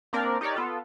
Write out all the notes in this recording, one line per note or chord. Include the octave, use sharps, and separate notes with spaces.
A#3 C4 D4 A#4 D5
D#4 G4 A#4 C#5 D5
B3 F4 A4